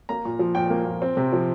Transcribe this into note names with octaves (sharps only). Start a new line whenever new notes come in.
A#3 A#5
A#2
F3
A#2 G5
A#3
A#2
C4
C3
F3